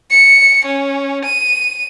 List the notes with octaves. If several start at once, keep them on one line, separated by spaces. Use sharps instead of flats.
C#7
C#4
D#7